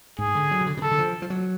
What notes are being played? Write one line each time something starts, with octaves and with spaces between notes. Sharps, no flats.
G#2 G#4
D3
F#3
C#3
D3
B2
C#3 A4
D3
F3
F3
F#3